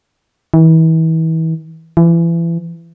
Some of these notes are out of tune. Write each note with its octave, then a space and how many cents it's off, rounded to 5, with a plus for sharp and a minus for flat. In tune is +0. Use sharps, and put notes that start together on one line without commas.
E3 -35
E3 +30